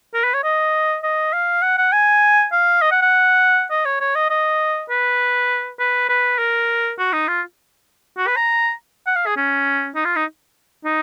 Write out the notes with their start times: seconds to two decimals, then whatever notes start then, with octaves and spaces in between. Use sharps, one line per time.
0.14 A#4
0.24 B4
0.34 C#5
0.44 D#5
1.03 D#5
1.33 F5
1.62 F#5
1.78 F#5
1.92 G#5
2.53 F5
2.82 D#5
2.91 F#5
3.02 F#5
3.71 D#5
3.85 C#5
4.00 C#5
4.15 D#5
4.30 D#5
4.90 B4
5.79 B4
6.09 B4
6.38 A#4
6.99 F#4
7.13 D#4
7.28 F4
8.18 F#4
8.27 B4
8.36 A#5
9.07 F#5
9.16 F5
9.26 G#4
9.37 C#4
9.95 D#4
10.05 F4
10.16 D#4
10.85 D#4